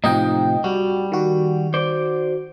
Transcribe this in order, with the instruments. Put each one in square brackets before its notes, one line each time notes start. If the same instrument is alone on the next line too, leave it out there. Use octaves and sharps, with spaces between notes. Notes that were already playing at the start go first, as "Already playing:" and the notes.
[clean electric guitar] A2 C3 F3 [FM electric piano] D#4 D#5 G5
[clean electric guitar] G3 [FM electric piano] F#4
[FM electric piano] D#3 F#4
[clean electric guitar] C5 D5